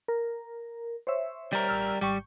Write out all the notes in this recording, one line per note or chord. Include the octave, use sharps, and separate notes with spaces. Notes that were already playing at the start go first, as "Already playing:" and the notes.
A#4
C5 C#5 E5
G3 A#4
A1 E6 F6
G#1 G3 G5 C#6